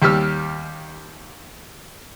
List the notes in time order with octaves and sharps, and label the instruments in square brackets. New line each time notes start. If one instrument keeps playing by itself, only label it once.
[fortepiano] D#2 G3 G4 E6 F6